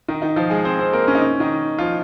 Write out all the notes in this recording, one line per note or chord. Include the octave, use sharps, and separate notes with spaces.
D#3 D#4
D#3 D#4
F3 F4
G#3 G#4
C4 C5
C4 C5
A#3 A#4
C#4
D#4
C#4
D#3 D#4
F3 F4